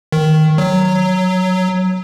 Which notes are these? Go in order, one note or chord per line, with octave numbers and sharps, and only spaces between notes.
D#3
F#3